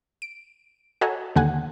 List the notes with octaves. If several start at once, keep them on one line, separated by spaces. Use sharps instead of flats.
D7
F#4 A4 C#5 D#5 G#5 A#5
D#2 D3 F#5 G#5